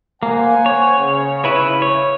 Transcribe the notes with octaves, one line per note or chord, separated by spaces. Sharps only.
A#3 C5 F#5 G#5
C#5
C#3
E4 B4 C#5
C#5